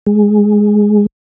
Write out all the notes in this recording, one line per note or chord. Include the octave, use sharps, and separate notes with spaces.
G#3